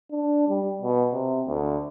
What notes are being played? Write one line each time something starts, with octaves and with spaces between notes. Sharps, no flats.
D4
G3
B2
C3
D2